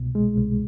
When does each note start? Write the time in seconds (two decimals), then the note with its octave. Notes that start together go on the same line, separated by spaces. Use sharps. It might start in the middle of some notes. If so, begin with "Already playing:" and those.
Already playing: C2 B2
0.15 G#3
0.37 C2